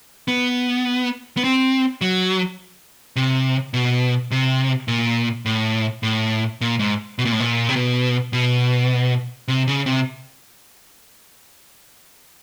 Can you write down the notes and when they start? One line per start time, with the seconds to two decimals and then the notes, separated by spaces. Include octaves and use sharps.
0.28 B3
1.37 B3
1.44 C4
2.01 F#3
3.16 C3
3.74 B2
4.31 C3
4.88 A#2
5.46 A2
6.03 A2
6.61 A#2
6.79 G#2
7.19 B2
7.25 A#2
7.32 A2
7.40 A#2
7.69 C3
7.76 B2
8.33 B2
9.48 C3
9.68 C#3
9.86 C3